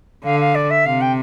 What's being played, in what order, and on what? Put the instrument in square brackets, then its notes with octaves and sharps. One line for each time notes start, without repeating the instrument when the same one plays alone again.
[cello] D3 [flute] F5
[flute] F5
D5
E5
[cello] C3 [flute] F5
[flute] G5